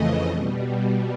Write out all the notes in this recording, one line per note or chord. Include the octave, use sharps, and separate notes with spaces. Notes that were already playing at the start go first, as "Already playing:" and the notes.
Already playing: F2 C#3 E3 A3 D#5
B2 G3